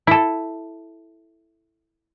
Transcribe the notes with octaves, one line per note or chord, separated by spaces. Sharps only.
E4 A4